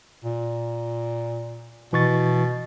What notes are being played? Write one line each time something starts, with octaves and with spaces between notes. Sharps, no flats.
A#2
B2 E3 C#6 A6